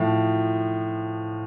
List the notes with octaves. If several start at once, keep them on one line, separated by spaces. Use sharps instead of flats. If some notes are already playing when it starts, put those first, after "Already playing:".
Already playing: A2 F3